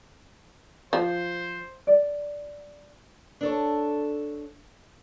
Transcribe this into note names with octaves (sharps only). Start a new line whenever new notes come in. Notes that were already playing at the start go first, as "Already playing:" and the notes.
F3 C5
D5
D4 A4 C#5